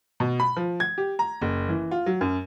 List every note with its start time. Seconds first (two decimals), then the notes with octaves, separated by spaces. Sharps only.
0.20 B2
0.40 B5
0.57 F3
0.80 G#6
0.98 G4
1.19 A#5
1.42 F#1
1.69 E3
1.91 F4
2.06 F#3
2.21 F#2